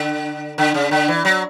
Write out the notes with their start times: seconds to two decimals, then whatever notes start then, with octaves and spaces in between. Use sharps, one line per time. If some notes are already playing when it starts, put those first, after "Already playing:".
Already playing: D3
0.58 D3
0.74 C#3
0.91 D3
1.08 E3
1.25 F#3